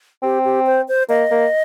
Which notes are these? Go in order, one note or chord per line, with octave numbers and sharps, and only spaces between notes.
C4 G4
G4
C5
C5
A#3 D#5
A#3